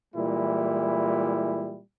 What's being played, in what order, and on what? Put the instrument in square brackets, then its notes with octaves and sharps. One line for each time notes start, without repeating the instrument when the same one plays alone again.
[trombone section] A#2 E3 G3 G#3 E4